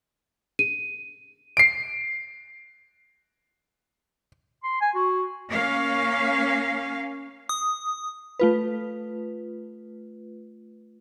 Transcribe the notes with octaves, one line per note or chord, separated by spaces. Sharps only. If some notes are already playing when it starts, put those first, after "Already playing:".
D#7
C7 D7
C6
G#5
F#4
A#3 C#4 F5
D#6
A3 F4 B4